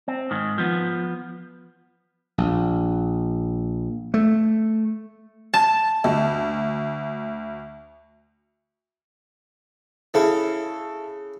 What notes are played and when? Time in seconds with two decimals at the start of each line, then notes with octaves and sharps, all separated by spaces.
0.08 C4
0.31 G#2 D#3
0.58 F3 B3
2.38 A#1
4.14 A3
5.54 A5
6.04 D2
10.14 C#3 C#4 E4 A4 B5